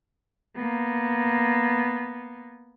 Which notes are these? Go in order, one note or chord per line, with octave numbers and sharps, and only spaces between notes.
A#3 B3